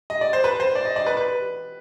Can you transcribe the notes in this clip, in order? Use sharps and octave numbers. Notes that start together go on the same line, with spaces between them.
D#5
D5
C5
B4
C5
D5
D#5
D5
B4
B4